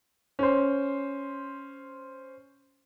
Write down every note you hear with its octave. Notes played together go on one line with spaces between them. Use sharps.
C#4 C5